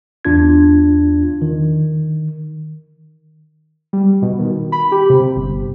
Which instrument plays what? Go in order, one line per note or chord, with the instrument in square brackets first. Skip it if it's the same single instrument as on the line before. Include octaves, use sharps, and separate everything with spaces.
[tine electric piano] E2 D4 F4 G#6
D#3
[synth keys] G3
B2
D#3
B5
G4
C3
G1